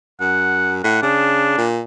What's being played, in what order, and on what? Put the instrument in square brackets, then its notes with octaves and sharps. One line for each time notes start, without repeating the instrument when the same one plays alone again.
[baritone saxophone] F#2 [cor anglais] F#5
[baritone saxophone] A2 [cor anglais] F#5
[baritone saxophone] C#3 [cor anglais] D4
[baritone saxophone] A#2